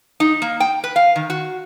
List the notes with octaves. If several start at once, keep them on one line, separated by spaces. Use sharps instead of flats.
D#4
A#3
G5
B4
F5
D#3
F#4